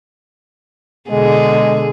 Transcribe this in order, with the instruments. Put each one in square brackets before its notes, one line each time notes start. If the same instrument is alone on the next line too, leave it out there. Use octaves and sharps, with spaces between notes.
[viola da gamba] B2 D3 G#4 [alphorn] G#3